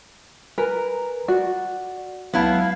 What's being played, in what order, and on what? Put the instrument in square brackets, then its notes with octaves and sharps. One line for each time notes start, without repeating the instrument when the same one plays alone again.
[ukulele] A#4 [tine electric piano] B4 G#5 A#5
[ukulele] F#4 [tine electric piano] D5
[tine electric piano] C#2 F#3 [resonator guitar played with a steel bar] B3 E4 A5 [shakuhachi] F5